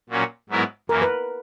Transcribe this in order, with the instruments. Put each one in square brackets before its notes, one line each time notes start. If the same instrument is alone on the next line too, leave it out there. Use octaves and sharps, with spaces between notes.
[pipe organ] A#2 F#3 A#3 C#4
G#2 F#3 B3 E4 A#4
[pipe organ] F#2 E3 A#3 [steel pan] A#4
[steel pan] B4